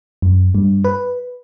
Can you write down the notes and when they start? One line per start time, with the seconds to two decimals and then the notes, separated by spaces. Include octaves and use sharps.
0.22 F#2
0.55 G2
0.84 B4